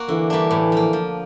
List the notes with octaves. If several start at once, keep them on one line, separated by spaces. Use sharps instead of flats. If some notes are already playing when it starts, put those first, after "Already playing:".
Already playing: A#3 F#4
D3 E3
G3 A#3 D4
A2
F3 A#3
F3